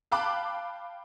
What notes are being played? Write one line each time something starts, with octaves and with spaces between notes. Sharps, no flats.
F5 G5 A5 B5 D6 F#6